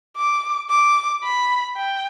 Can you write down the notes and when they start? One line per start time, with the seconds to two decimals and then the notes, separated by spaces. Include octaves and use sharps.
0.17 D6
0.70 D6
1.24 B5
1.77 G5